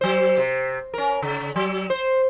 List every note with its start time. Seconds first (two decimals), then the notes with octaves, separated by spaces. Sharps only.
0.01 F#3 C5
0.38 C3
0.94 C#4 A#4
1.22 C#3
1.56 F#3
1.90 C5